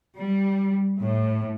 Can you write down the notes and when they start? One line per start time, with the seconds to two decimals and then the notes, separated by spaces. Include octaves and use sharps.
0.18 G3
1.00 A2